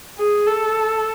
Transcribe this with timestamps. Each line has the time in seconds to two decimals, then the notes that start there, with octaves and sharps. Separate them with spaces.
0.19 G#4
0.47 A4